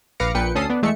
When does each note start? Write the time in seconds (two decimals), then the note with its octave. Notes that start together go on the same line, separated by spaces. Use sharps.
0.20 A#1 B4 F5 D6 A#6 C#7
0.35 A#1 A#2 B4 G5 C#7
0.55 D2 C#4 A4 D#6 C7
0.70 B3 D4
0.83 E2 G#3 A3 E5 C#7